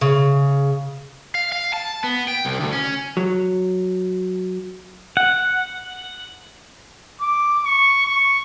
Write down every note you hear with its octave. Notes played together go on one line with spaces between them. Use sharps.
C#3
F5
F5
A5
B3
G5
C2
D2
C#4
F#3
F#5
D6
C#6
C#6